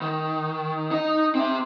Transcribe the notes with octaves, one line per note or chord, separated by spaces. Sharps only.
D#3
D#4 D#5
C4 E5